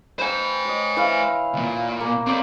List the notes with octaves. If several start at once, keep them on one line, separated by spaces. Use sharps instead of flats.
B4 C5 G5 G#5
C#5 D#5
E3 B4 F5
C#2 A#2
A#3
C4 A4 C#5 D5